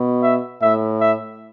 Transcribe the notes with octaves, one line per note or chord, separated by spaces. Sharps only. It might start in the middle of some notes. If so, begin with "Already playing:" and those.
Already playing: B2
E5
A2 E5
E5